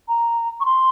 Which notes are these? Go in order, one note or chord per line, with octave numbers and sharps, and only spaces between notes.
A#5
C#6
C6